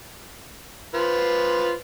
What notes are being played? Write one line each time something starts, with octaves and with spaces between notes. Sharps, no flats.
F4 B4 C5